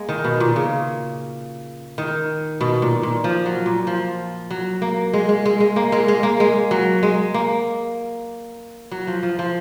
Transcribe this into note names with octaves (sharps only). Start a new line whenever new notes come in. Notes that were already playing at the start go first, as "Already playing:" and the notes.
Already playing: G#3 A#3
D#3
B2
A#2
C#3
D#3
B2
A#2
A#2
F3
F#3
A#2
F3
F#3
A#3
G#3
G#3
G#3
G#3
A#3
G#3
G#3
A#3
G#3
F#3
G#3
A#3
F#3
F3
F3
F3